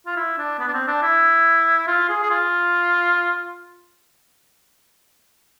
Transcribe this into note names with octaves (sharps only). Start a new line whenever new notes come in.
F4
E4
D4
B3
D4
C4
D4
E4
F4
G#4
G#4
F4